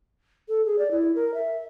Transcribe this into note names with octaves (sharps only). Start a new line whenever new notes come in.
A4
G#4
D5
E4
A#4
E5